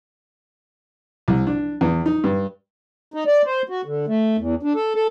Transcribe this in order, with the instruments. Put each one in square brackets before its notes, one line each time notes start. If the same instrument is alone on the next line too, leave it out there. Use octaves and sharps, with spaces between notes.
[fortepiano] C2
D4
E2
D#4
G2
[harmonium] D#4
D5
C5
F#4
D3
A3
E2
D4
A4
A4